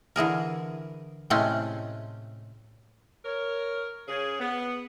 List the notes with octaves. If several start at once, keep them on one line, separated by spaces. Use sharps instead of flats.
D3 E3 G#4 A#4
A2 C3 G#3 A3 C4 C#4
A#4 C#5
C#3 G#4
B3